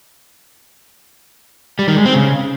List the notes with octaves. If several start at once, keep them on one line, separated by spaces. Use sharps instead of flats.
G3
D#3
G#3
C4
C#3